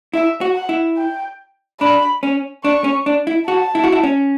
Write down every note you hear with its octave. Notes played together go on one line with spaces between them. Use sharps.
E4 E5
F#4
F#5
E4
G5
D4 B5
C#4
D4 C#6
C#4
D4
E4
F#4 A5
E4
F#4
E4
C#4